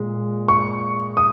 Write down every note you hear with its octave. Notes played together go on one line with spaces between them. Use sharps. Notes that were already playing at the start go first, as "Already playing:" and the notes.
Already playing: A#2 G#3
C#6
D#6